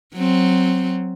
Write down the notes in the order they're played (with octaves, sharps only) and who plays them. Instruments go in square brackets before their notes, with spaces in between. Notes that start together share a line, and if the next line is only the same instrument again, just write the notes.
[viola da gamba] F#3 C4